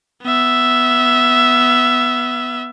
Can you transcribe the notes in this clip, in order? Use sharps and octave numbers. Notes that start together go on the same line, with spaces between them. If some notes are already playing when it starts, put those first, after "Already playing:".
B3 E5